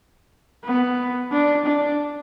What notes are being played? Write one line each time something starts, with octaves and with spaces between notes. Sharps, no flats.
B3
D4
D4